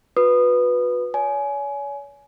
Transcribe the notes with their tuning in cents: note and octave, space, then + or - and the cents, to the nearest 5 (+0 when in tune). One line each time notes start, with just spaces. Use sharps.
F#4 -40 B4 +0 D#6 -20
C#5 +40 G#5 +20